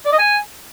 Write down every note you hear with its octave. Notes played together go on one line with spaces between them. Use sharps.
D5
D#5
G#5